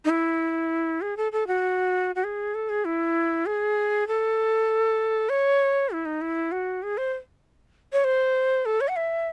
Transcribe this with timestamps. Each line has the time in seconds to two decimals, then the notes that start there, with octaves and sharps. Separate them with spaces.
0.05 D#4
0.10 E4
1.01 G#4
1.17 A4
1.32 A4
1.47 F#4
2.15 F#4
2.24 G#4
2.54 A4
2.69 G#4
2.85 E4
3.46 G#4
4.07 A4
5.29 C#5
5.91 E4
6.06 D#4
6.21 E4
6.52 F#4
6.83 G#4
6.97 C5
7.93 C#5
8.04 C5
8.65 A4
8.81 C#5
8.88 F#5
8.96 E5